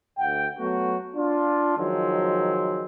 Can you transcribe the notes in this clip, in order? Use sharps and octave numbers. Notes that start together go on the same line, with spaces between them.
D2 F#5 G5
F#3 A3 B3 F#4
D4 F4
D#3 F3 F#3 G#3 C4